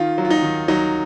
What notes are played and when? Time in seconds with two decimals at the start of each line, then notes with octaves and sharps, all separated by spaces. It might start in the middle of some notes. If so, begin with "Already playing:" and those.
Already playing: D#3 F4
0.18 F#3
0.25 F4
0.30 D#4
0.43 D#3
0.68 F#3 D#4